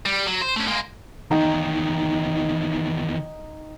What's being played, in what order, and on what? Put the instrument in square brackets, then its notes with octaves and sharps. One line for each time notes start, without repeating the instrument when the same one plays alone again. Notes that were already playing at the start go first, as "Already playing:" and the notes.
[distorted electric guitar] G3
F#3
C5
A3 C#4
G#3 A#3
[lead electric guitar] E2 D#3 [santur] D#4 G5